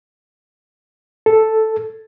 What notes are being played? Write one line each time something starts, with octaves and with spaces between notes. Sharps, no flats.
A4